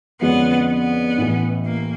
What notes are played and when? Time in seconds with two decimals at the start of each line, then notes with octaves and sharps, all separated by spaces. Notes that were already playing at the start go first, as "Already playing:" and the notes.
0.21 F2 D3 F3 G#3 B3 C#4
0.70 B3
1.18 A1 A2 E3
1.66 A#3